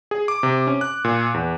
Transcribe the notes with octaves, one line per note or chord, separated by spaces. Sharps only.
G#4
D6
C3
C#4
F#6
A#2
E2